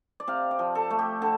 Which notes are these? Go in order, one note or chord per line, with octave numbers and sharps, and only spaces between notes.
D5
C3 F5
D5
F3
A4
A3
G4
D3 A4